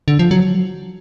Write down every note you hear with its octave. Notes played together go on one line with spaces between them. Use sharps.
D3
F3
F#3